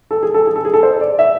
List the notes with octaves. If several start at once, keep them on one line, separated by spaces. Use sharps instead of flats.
A4
G#4
A4
G#4
A4
G#4
A4
C5
D5
E5